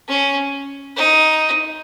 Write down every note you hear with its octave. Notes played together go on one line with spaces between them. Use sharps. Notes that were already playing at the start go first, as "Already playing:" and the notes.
C#4
D#4